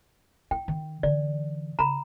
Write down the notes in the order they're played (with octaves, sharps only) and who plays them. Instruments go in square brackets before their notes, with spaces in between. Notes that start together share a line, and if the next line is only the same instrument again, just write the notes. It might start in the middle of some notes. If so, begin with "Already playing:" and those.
[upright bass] E4 [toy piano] G5
[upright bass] D#3
[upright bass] D3 E3 [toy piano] D5
[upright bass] C#3 [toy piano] A#5 B5